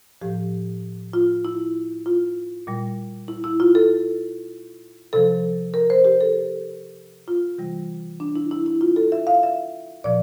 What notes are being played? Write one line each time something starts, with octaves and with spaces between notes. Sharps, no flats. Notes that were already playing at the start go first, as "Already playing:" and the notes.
A2 F3 G4
F4
E4
F4
A#2 G3
E4
E4
F4
A4
C3 F3 A4
A#4
C5
G4
A4
F4
C3 E3 G3
D4
E4
E4
E4
F4
A4
E5
F5
E5
A#2 F3 D5